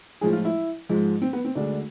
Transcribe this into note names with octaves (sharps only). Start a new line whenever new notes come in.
A2 F3 G#3 G#4
F4
E4
G#2 F3 G#3
C4
B3
C4
D2 D3 G#3 D4